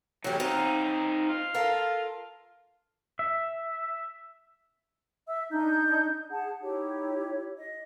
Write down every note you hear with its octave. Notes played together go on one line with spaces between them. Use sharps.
E2 A2 F#3 G4
C4 D#4 F4
F4
A4 A#4 F5
E5
E5 E6
D4 D#4 G6
G#4 F#5 A5
D#4 E4 G4 C#5
D#5